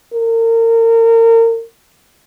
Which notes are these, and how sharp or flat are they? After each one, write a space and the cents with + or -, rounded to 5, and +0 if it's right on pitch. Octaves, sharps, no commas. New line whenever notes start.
A#4 -30